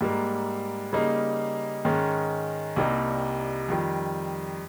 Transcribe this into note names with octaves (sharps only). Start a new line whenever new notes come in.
G#2 G3 A#3
C#3 G3 A#3 D#4
G#2 D#3 G#3 C#4
C2 C3 G3 A#3 D#4
F2 D#3 G3